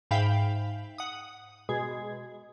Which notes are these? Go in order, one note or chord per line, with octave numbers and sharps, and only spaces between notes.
G#2 E5 F5 G5 B5 G6
F#5 D#6
B2 G#3 G#4